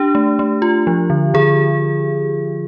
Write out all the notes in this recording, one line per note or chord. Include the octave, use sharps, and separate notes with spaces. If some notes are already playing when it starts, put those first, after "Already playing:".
Already playing: D4 G4
A3
A3
F4
F3
D3
D3 G#4